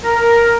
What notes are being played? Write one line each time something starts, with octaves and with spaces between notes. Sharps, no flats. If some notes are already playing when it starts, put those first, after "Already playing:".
A#4